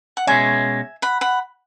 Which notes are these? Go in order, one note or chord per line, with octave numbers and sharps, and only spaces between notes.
F#5
B2 G#3 C#4 E5 G#5
F#5 B5
F#5 B5